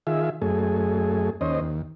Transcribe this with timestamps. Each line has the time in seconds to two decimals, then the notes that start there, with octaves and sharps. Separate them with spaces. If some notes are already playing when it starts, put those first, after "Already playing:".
0.07 D#3 F4 G#4 E5
0.42 F#2 A3 G#4
1.41 D#2 C#4 C5 D#5
1.60 D#2